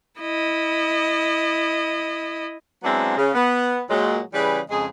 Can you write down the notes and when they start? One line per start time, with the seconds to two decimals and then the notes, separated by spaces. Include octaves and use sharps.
0.21 E4 D#5
2.83 F#3 G#3 B3 C4 D4 E4
3.16 C#3
3.34 B3
3.90 A#2 F#3 G#3
4.34 C#3 E3 G3 G#4 B4
4.70 F2 C#3 G#3 G#4